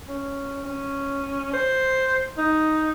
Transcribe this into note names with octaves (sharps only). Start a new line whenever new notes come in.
C#4
C#4
C5
D#4